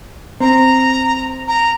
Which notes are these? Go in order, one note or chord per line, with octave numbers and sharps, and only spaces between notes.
C4 A#5
A#5